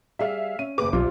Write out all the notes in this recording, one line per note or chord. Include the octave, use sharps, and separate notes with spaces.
G3 G#4 E5 F5
C#4 D#7
F#1 D#2 G#4 B4 D6
B1 C3 G3 F4